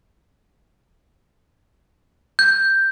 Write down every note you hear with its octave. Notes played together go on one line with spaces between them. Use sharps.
G6